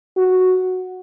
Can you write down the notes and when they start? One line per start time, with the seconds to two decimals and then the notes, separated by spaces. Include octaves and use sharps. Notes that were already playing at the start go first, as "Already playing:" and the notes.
0.17 F#4